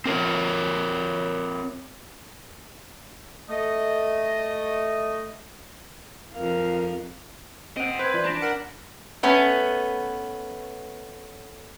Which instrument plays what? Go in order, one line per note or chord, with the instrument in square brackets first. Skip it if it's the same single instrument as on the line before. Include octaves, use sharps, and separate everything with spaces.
[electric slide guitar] C4 A#4 C#5
[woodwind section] A3 D#5
[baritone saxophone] F2 [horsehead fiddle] A#4 F5
[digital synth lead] C4 [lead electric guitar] D#5 F#5 [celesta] D7
[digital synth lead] C4 [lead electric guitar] B4 [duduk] C5 [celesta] F#6 G#6
[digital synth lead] E3 [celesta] F4 D5
[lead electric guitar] D4 [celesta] B5 A#6 B6
[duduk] A#4 [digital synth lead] F#5
[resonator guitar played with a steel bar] A3 B3 C#4